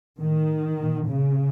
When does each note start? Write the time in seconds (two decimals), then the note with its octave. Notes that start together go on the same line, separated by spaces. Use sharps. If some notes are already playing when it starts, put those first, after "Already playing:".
0.20 A2 D#3
0.79 A#2
1.08 C#3